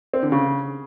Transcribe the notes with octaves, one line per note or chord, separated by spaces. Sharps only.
C4
D3
C#3